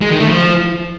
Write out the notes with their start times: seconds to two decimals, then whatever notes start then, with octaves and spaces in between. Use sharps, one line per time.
0.01 G#3
0.11 D#3
0.20 A3
0.29 F3